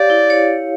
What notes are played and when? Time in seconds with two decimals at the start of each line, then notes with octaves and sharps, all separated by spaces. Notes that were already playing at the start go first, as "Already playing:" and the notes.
Already playing: G4 C#5 D5 F5
0.10 E4
0.30 C#5